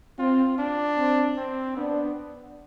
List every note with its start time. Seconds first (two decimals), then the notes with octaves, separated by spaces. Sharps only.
0.19 C4 F4
0.58 D4
0.97 C4
1.37 C4
1.76 B3 D4